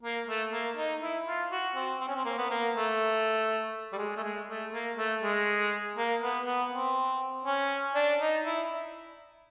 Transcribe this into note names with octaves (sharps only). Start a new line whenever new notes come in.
A#3
A3
A#3
D#4
E4
F4
F#4
C4
C4
C#4
C4
A#3
B3
A#3
A3
G3
G#3
A3
G#3
A3
A#3
A3
G#3
A#3
B3
B3
C4
C#4
D4
D#4
E4